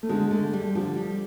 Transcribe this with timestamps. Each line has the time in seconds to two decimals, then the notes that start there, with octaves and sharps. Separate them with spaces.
0.03 A3
0.09 D3 G#3
0.31 D3 A3
0.53 G3
0.75 D3 F3
0.97 G3